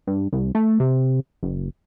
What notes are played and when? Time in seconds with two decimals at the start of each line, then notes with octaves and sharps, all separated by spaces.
0.07 G2
0.33 C2
0.55 A3
0.80 C3
1.43 F#1